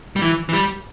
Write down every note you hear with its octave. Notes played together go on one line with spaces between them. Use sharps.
G3
E3
E3
G3